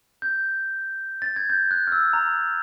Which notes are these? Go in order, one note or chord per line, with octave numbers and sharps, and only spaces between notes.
G6
A6
G#6
G6
F#6
F6
E6
A#5